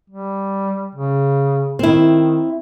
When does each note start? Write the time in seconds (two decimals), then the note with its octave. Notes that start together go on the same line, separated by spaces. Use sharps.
0.10 G3
0.95 C#3
1.79 D#3 C4 E4